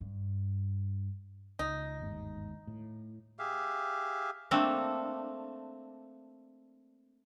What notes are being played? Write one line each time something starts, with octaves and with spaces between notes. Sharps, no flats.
G2
C#2 D#4
G1 D#2 G#2
A2
G4 G#4 E5 F5
A3 A#3 C4 D4